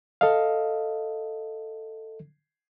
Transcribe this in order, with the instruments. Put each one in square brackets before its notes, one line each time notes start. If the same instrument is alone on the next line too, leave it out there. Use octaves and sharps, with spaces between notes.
[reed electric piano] A4 D#5 F5